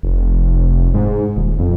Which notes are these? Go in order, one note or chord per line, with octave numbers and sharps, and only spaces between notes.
F1
G#2
D#1
F2